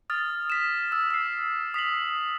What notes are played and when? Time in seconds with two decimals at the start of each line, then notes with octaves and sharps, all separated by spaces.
0.10 D#6 F6 A6
0.50 B6 E7
0.92 E6
1.11 E6 C7
1.74 D#6 B6 C7 F#7